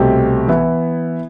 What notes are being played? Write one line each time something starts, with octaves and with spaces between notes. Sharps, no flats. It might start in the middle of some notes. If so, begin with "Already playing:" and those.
Already playing: C2 B2 A3 C4 G4
E3 B3 E4